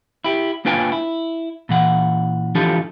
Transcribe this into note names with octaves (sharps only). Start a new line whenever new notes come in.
E4 G4
A#3 D4 F4 B4 G5 G#5
E4
A#2 E3 F#5
E3 F3 D4 F4 G4 A4